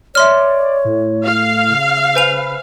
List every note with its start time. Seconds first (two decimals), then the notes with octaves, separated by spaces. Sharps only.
0.15 C#5 D5 E5 C6 F6
0.85 A2
1.25 F5
1.68 C#3
2.15 B4 C5 G#5 F7